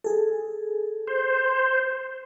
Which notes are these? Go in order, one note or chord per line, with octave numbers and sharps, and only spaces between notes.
G#4 A4
C5